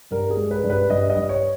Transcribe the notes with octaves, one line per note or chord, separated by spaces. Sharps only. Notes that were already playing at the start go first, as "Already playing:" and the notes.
G2 A#4
G#4
G#3
B4
G2
B4
G2 D#5
D#5
G2
C#5